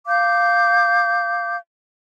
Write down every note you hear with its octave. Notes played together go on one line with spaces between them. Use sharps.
F5 D6 G6